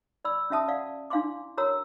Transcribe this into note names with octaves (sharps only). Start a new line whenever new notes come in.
D5 B5 E6
C#4 F#4 E5 A5 D#6
D5 F5 F#5
D4 E4 F5 G#5 C6 D6
F#4 A#4 C#5 A#5 E6